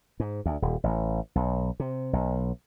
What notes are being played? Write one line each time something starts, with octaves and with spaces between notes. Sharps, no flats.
G#2
D2
D#1
A1
B1
C3
B1